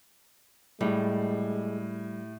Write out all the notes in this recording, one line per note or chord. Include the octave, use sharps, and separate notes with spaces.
A2 G3 G#3